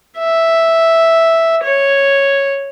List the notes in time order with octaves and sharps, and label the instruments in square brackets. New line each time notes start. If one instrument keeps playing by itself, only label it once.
[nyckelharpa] E5
C#5